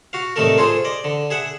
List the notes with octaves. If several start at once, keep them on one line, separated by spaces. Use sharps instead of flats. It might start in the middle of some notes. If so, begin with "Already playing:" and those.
F#4 F5
C2 A2 D#3 A3 A4 A#4
F4 G#4 A4 C5
D5 D#5
D3
G#4 E5 F#5